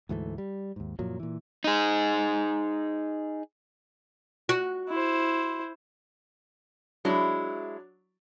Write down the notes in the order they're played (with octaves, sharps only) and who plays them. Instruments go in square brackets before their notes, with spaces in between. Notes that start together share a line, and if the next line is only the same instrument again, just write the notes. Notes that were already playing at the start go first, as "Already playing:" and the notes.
[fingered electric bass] D2 G#2 E3 A3
G3
D#2 G#2
F#2 A#2 F3 F#3
A#2 E3
[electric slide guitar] D#4 G#4
[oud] F#4
[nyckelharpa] E4 C5
[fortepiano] F#3 D4 F#4 [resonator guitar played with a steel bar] G#3 E4